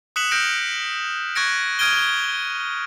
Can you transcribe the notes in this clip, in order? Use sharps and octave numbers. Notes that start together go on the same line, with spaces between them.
D#6 F#6 B6 C#7 E7 F#7
F6 G6 A#6 C#7 D7
C#6 F#6 G#6 A#6 C#7 D7
D#6 F6 G#6 D7 D#7 G7